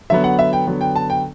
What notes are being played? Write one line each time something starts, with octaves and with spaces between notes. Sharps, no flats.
D3 F#3 B3 E5
F#5
E5
G5
D3 F#3 B3
G5
A5
G5